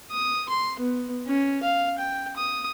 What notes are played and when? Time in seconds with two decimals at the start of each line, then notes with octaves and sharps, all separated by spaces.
0.11 D#6
0.49 C6
0.79 B3
1.27 C#4
1.63 F5
1.98 G5
2.37 D#6